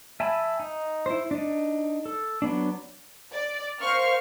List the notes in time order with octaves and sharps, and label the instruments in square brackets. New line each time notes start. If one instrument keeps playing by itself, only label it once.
[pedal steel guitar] E5 G#5 A5 B5
D#4
E4 C5
D4 D#4
A4
F#3 B3 D4
[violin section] D5
[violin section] A#4 C#6 F6 [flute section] C5 F5